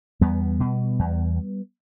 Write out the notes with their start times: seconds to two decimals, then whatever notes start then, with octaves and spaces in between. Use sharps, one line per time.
0.21 E2 G3 B3
0.60 B2
0.99 E2